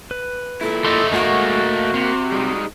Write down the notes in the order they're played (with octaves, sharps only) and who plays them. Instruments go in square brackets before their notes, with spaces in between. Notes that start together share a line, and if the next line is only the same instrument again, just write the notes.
[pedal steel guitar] B4
[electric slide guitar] A#2 E4 [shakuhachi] A4
[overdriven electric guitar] A3 D#4 [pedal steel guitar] C6 D6 E6
[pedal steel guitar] G#3 F#5 C#6 [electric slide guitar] A#3 [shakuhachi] F#4
[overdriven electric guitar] C3 [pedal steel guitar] C6
[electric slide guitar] G3 G#3 D#4